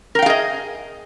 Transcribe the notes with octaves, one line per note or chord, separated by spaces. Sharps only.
G#4 A#4 D#5 F5 G5